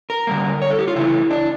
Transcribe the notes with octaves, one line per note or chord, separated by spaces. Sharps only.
A#4
D3 G3 A#3
C#5
A4
G4
F4
C#3 E3 A3 E4
D4